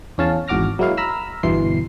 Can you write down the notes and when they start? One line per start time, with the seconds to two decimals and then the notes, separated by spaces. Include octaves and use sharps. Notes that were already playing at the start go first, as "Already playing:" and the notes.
0.18 E2 C#4 F5 A5
0.48 G#1 E2 F#4 D6 F6 A#6
0.79 F#3 G#3 A#3 E4 F#4 F5
0.97 A#5 B5 E6 F6
1.43 G1 E2 B2 E3 C6 C7